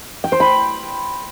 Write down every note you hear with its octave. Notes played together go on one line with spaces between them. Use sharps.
G5
C5
B5